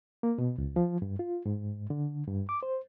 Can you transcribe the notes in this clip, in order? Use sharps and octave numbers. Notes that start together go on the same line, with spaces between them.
A#3
B2
C#2
F3
G2
F4
G#2
D3
G2
D6
C5